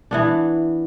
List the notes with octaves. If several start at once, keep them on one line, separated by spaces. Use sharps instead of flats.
E3 B3 D4